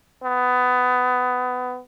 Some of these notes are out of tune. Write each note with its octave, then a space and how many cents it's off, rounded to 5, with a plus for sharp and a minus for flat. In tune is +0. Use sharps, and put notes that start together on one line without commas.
B3 +20